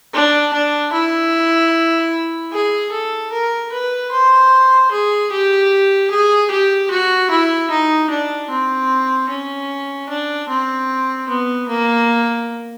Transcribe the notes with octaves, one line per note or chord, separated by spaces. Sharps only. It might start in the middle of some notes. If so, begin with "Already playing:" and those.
D4
D4
E4
G#4
A4
A#4
B4
C5
G#4
G4
G#4
G4
F#4
E4
D#4
D4
C4
C#4
D4
C4
B3
A#3